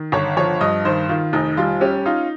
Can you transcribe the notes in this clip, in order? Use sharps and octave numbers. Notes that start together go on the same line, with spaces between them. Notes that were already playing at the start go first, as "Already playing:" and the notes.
Already playing: D#3
G1 C#5
F3 C#5
G2 D#5
D#3 C5
D#3 F4
F1 D#4
G3 F4
C#4 G4
D#4 F4